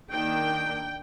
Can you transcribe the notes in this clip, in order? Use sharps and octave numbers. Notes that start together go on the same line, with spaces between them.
D#3 A#3 D4 G5